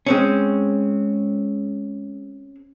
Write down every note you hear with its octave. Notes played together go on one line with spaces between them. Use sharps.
G#3 C4 C#4